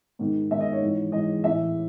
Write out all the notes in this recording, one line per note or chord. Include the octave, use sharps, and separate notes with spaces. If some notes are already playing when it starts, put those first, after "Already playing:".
G#2 D#3
G#2 D#3 E5
D#5
C#5
G#2 E3
G#2 E3 D#5
A2 E3 E5